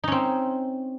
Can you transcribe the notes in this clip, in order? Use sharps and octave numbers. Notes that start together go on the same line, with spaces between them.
C4 C#4 D#4